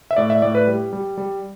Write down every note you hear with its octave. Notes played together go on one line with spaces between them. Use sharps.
E5
A2 D5
E5
A2 D5
B4
G3
G3
G3